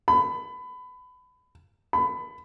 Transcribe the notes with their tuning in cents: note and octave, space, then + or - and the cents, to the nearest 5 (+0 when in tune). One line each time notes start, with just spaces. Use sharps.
B5 +25
B5 +25